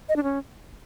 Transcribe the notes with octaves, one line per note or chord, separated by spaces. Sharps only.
D#5
D4
C#4